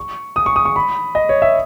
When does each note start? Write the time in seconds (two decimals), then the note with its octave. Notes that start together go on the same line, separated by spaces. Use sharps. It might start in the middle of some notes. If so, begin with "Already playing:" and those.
Already playing: C#6
0.36 D#6
0.46 C#6
0.56 D#6
0.65 C#6
0.76 B5
1.15 D#5
1.29 C#5
1.42 E5